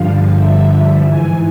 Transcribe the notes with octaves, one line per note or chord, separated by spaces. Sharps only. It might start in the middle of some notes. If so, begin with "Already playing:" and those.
Already playing: G2 D3 F3 F5
E5
G#2 E3 G#5